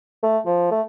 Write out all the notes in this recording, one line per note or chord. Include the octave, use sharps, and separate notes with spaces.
A3
F3
A3